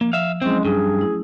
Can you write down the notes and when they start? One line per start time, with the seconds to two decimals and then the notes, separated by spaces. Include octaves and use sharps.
0.01 F3 A#3
0.13 F3 E5 F5
0.42 F#3 G#3 C4 C#4 E4
0.65 G2 G#4 C#6
0.98 A3 E4